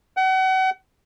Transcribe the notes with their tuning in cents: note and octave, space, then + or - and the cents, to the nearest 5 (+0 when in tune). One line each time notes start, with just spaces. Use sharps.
F#5 +35